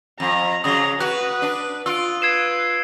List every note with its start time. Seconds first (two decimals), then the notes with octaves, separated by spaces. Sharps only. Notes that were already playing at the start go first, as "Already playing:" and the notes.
0.20 F2 A#5
0.64 C#3 F#3 A#5 D#6
1.00 F#4 B4 F#6
1.42 D4
1.86 F4 E6 D7
2.22 B4 G#6 C7 E7